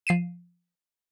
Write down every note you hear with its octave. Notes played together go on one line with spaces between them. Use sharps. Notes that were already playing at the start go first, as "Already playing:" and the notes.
F3 C7 D#7 E7